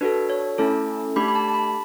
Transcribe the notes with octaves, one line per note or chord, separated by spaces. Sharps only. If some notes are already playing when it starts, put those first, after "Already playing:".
D4 F#4 A4 B4
C#5
A3 C#4 E4 A4 A5
A3 D4 G4 B5
B5
A5
A5
B5